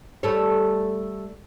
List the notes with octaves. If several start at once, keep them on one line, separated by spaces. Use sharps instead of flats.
G3 A3 C#5